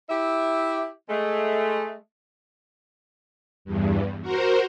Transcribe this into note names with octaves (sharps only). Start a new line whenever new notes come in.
E4 G4 E5
G#3 A3
E2 G2
F#4 A#4 C5